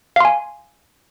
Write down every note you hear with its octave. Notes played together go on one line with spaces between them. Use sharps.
F5 G#5 C6